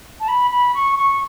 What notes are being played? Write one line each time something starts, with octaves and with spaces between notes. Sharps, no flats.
A5
B5
B5
C#6
C#6